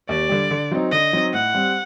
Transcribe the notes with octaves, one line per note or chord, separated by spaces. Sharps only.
D#2 D5
D3 G3
D3
F#3 C4 D#4
D3 D#5
F#3 C4 D#4
A2 F#5
G3 C4